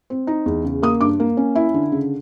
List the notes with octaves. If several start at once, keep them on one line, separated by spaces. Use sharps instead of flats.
C4
D#4
E2
C#3
A#3 D#6
G2 D6
A#3
C#4
E4
D3
C#3